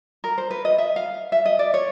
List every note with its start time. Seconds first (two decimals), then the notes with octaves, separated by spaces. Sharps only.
0.24 A#4
0.38 C5
0.51 B4
0.65 D#5
0.78 E5
0.96 F5
1.32 E5
1.45 D#5
1.59 D5
1.74 C#5